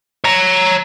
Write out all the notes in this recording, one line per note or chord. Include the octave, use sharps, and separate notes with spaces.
C#5 A#5